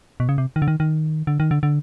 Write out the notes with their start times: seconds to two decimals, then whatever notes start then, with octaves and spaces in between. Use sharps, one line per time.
0.20 B2
0.29 C#3
0.38 C3
0.56 D#3
0.62 D3
0.68 D#3
0.80 D#3
1.27 D3
1.40 D#3
1.51 D3
1.63 D3